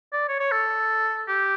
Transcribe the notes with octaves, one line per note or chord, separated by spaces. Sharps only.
D5
C#5
C#5
A4
G4